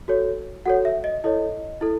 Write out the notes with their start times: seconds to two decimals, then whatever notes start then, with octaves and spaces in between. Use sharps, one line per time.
0.08 F#4 A4 C#5
0.66 F#4 A4 C#5 F#5
0.85 E5
1.04 D#5
1.24 E4 A4 C#5 D#5
1.81 E4 A4